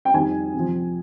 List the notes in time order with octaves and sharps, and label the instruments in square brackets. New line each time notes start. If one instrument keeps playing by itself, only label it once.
[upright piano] G5
F2 D#3 G3 G#5
F2 C3 F3